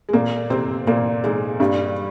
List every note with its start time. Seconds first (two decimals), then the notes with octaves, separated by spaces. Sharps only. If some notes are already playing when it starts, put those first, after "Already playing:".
0.09 G#3
0.13 A#2 A#3
0.50 C3 C4
0.87 A#2 A#3
1.24 G#2 G#3
1.60 G2 G3